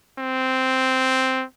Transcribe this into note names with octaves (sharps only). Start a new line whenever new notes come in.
C4